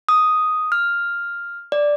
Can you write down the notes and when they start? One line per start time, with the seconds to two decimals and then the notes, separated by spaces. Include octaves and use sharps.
0.09 D#6
0.72 F6
1.72 D5